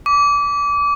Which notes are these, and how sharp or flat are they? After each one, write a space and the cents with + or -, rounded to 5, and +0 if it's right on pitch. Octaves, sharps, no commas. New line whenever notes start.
D6 -25